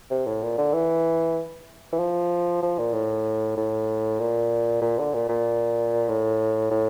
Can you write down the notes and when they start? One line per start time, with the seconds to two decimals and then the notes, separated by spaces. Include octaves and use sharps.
0.11 C3
0.26 A2
0.43 A#2
0.58 D3
0.73 E3
1.92 E3
1.99 F3
2.62 F3
2.78 A#2
2.93 A2
3.57 A2
4.19 A#2
4.82 A#2
4.98 D3
5.14 A#2
5.29 A#2
6.09 A2
6.71 A2